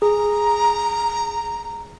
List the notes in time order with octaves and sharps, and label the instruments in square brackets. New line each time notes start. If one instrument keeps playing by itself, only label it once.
[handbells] G#4 [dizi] A#5